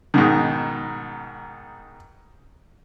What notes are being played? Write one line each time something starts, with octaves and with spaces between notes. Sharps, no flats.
G#2 B2 D#3